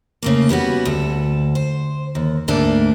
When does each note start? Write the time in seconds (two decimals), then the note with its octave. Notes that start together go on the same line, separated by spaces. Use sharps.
0.23 C#3 A3 A#3
0.49 G3 B3 C#4 F#4
0.85 D2 A4
1.55 C5
2.15 D#2
2.48 D2 G#2 A3 A#3 D4